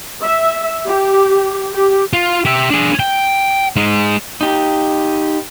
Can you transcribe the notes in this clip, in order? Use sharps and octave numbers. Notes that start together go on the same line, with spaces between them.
E5
G4
G4
F4
G4 E5
D4 G#4
G5
G#3 D#4
D#4 G4